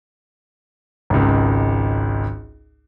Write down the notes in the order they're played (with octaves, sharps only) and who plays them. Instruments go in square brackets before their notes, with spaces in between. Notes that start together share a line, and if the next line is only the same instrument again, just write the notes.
[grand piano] G#1 C#2